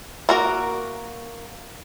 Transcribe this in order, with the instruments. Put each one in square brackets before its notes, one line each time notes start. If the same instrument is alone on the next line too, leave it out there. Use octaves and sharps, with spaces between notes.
[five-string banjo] A#3 F#4 A#4